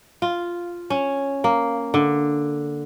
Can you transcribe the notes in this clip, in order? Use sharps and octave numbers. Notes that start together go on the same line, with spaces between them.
F4
C#4
A#3
D3